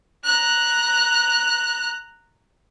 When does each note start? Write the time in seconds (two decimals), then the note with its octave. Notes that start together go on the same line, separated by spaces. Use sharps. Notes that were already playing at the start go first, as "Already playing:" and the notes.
0.25 A#5 F#6